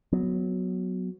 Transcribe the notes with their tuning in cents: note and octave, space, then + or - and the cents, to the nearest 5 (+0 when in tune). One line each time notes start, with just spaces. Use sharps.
F#3 -5 B3 +0